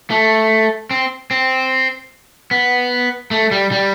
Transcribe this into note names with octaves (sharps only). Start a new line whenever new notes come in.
A3
C4
C4
B3
A3
G3
G3